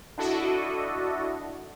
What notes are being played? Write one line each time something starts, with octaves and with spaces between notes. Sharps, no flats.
D4 E4 F#4 A4 D#5 E5